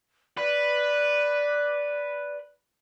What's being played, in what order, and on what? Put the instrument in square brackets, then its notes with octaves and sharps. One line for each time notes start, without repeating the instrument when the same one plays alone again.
[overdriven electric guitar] B4 [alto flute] D5